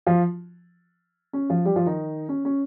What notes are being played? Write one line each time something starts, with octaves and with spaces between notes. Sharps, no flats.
F3 F4
C#4
F3 F4
G3 G4
F3 F4
D#3 D#4
C#4
C#4